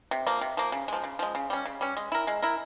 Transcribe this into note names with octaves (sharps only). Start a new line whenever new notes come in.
C3
F3 A#3
C3
F3 A#3
C#3
F3 G#3
C#3
F3 G#3
C#3
G3 C#4
C#3
G3 C#4
G#3
E4 A#4
G#3
E4 A#4